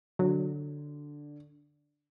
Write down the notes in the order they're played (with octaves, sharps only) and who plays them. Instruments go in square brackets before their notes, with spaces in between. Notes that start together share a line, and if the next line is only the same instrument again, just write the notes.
[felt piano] D3 [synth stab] F#3